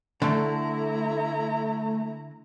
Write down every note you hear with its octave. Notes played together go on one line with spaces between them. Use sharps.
D3 A3 E4 A#5